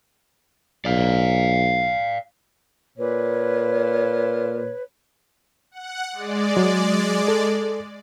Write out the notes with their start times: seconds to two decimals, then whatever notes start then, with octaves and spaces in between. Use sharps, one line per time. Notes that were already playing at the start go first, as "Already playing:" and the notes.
0.85 B1 D5 F5
2.98 A#2 B4 C#5
5.71 F#5
6.12 G#3 D5
6.57 F#3
7.28 A4